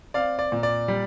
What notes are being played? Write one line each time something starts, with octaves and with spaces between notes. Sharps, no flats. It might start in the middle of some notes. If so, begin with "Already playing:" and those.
C4 D5 F5
D5
A#2
D5
G3